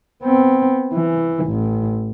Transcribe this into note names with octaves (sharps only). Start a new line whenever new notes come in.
B3 C4
E3
A1